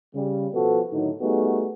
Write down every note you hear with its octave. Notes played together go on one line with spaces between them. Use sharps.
C#3 G3
B2 F3 B3 F#4 A4
A2 D3 D#3 F#3 D#4
G3 A3 B3 D#4 F#4 G#4